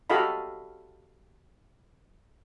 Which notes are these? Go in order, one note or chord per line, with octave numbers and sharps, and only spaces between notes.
F#4 G4 A4 D#5 F5 B5